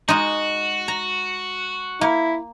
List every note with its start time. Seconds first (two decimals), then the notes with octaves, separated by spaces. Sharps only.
0.08 G#3 D#4 F#4
0.88 A#5
2.01 A#3 E4